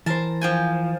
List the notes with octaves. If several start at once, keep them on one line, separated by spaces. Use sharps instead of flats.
E3 A#4 C5 A5
F3 G5 G#5